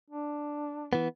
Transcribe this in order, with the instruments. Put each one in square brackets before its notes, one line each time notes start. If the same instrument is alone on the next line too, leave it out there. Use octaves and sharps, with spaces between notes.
[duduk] D4
[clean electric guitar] E3 B3